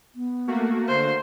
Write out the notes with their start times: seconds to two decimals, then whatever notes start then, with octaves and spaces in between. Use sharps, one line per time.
0.15 B3
0.48 A3 A#3 F#4
0.88 D3 C5